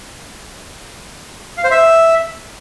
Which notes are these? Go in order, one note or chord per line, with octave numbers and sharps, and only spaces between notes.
F5
C5
E5